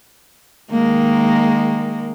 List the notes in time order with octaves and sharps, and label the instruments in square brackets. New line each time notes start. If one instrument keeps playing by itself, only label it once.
[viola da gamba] D#3 G#3 A#3